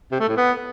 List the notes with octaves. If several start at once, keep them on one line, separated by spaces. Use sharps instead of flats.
C3
A3
A2
B3